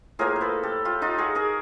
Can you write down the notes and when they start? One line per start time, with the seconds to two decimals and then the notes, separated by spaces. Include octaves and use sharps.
0.19 A2 F3 A#3 G#4 A#4
0.36 C5
0.41 A4 B4
0.63 G4 A4
0.85 F4 G4
1.02 D#4 F4
1.18 F#4 G#4
1.35 G#4 A#4